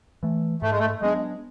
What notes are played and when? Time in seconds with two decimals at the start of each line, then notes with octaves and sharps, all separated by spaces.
0.23 E3 A3
0.62 G#2 A3
0.71 G#3
0.79 A3
1.02 F#3 G#3 B3 D4